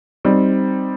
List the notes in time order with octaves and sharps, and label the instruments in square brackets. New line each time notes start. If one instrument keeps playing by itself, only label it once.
[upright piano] G3 C4 D#4